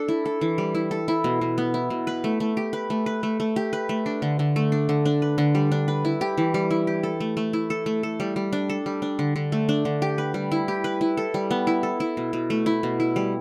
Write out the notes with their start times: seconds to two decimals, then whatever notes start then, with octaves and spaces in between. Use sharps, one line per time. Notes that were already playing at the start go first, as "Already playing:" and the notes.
Already playing: D4 A4
0.08 E4
0.26 A4
0.41 E3
0.58 G3
0.75 E4
0.91 A4
1.08 E4
1.24 B2
1.41 B2
1.58 B3
1.74 E4
1.90 B2
2.07 B4
2.24 A3
2.40 A3
2.57 G4
2.73 B4
2.90 A3
3.06 B4
3.23 A3
3.40 A3
3.56 G4
3.73 B4
3.89 A3
4.06 D4
4.22 D3
4.39 D3
4.56 A3
4.72 D4
4.89 D3
5.05 D4
5.22 B4
5.38 D3
5.55 G3
5.72 D4
5.88 B4
6.05 E4
6.21 G4
6.38 E3
6.54 G3
6.71 E4
6.87 G4
7.03 A4
7.20 A3
7.37 A3
7.53 E4
7.70 A4
7.86 A3
8.03 A4
8.20 G3
8.36 G3
8.53 D4
8.70 A4
8.86 G3
9.02 D4
9.19 D3
9.36 D3
9.52 A3
9.69 D4
9.85 D3
10.02 G4
10.18 B4
10.34 G3
10.52 E4
10.68 G4
10.84 B4
11.01 E4
11.17 A4
11.34 G3
11.51 B3
11.67 E4
11.83 A4
12.00 E4
12.17 B2
12.33 B2
12.50 A3
12.66 E4
12.83 B2
13.00 E4
13.16 G3